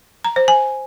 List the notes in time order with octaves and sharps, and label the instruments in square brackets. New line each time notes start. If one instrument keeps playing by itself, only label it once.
[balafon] A#5
C5
G#5